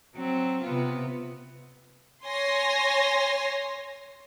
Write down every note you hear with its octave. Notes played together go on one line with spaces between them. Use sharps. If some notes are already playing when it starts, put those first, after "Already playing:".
F#3 C4
C3 B3 F4
C#5 G#5 C6 A#6